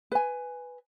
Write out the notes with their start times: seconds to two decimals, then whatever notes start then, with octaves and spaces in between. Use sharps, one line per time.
0.12 B4 G#5